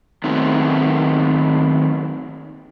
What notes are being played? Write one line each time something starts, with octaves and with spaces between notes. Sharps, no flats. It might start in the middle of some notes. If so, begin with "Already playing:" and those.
D#3 F#3 A3 B3 C4